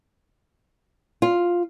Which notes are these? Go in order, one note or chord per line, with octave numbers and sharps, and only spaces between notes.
F4